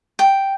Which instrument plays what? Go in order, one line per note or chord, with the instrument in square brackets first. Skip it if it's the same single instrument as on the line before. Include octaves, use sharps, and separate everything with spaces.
[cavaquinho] G5